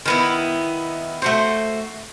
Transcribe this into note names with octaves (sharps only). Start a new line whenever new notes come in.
D#3 B3 E4
A3 F#4 C5